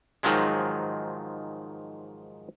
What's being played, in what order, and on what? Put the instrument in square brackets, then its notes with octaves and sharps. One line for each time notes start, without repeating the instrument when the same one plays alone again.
[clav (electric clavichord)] G#2 D#3 F3 F#3 G#3